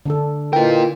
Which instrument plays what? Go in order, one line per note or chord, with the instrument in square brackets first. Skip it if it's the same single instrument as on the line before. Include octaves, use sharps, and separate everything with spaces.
[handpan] D3 D4 A4
[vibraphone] E4 B4 D#5 [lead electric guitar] F4 A#4 [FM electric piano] G5